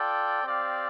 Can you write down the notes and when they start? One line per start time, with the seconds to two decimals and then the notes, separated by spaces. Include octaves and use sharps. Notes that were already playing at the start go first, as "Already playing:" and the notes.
Already playing: F4 A4 D5 G5
0.43 C4 G4 D5 F5